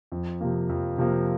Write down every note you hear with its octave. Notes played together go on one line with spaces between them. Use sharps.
F2
C3 F3 A#3
F2
C3 F3 A#3